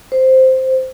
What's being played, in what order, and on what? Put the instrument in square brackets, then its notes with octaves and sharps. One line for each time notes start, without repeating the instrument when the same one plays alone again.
[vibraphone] C5